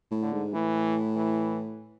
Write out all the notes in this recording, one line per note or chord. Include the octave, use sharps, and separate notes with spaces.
A2
D3
G#2
A2 E3
E3